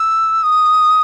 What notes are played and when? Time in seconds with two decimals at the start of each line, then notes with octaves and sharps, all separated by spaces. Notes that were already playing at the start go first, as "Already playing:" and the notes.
Already playing: E6
0.43 D#6